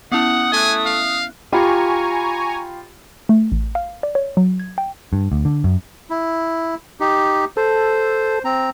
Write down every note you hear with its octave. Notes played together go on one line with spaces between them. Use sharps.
B3 C#4 E4 F#5 D#6
A3 E5 G#5 F#6
F5
F4 G4 G#5 A#5 B5 C#6
A3
A1
F5
D5
C#5
F#3
G#6
G5
G2
D2
D3
F#2
E4
D#4 G4
A4 C5
C4 A#5